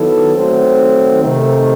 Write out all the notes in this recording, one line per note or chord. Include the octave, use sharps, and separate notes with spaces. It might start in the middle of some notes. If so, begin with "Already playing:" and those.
Already playing: D#3 F#3 B3 E4 A4
D#3 F#3 A3 C4
C3 D#3 A3